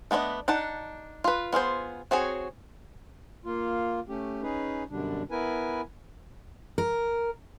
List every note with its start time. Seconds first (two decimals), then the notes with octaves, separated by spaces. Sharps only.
0.11 A3 B3 D4 C#5 D#5
0.48 D4 D#4 F#5 A5
1.24 F4 B4
1.53 B3 F4 G#4 C5
2.11 C4 F#4 G#4 C#5
3.45 A#3 F4
4.08 A3 C#4 G4
4.43 C#4 D#4 G#4 B4
4.90 F#2 B2 D3 G3 D4
5.31 B3 E4 A#4 B4 G#5
6.78 A#4